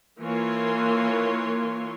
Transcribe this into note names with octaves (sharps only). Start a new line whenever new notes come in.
E3 A#3 F4 C#5 C6